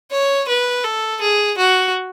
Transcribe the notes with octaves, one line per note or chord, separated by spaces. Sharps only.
C#5
B4
A4
G#4
F#4